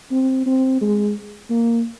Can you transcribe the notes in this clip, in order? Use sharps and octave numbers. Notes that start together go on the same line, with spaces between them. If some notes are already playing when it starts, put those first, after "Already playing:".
C4
C4
G#3
A#3